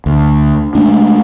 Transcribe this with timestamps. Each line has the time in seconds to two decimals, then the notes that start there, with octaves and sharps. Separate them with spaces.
0.06 D2
0.75 G#3 A3 D4